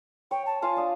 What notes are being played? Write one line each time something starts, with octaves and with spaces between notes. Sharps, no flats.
C#5 G5
A5
F4 F5 G#5 A5
D4 D#6